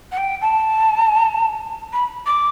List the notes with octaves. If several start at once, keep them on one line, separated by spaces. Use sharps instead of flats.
F#5
G5
A5
B5
D6